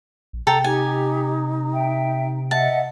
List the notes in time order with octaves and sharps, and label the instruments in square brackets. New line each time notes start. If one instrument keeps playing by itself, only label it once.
[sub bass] A#1
[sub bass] C3 [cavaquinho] A4 G5 A#5
[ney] D#4 [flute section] G4 [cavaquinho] G#5
[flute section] E5 G5
[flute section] D#5 F#5 [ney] E5 [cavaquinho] A5